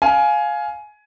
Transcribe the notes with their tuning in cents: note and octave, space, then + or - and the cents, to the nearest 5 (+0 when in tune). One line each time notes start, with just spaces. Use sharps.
F5 +5 G#5 +15